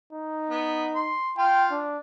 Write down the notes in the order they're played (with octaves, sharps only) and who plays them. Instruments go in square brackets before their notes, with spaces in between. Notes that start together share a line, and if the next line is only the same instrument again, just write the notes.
[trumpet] D#4
[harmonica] B3
C6
[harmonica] F4 [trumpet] G5
[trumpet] D4